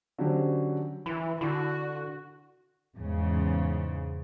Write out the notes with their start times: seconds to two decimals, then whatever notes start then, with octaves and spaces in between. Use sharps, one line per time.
0.18 D3 F#3 C#4 F#4 G4 C5
1.06 E3 E4
1.41 D3 E4 F#4
2.96 E2 G#2 C#3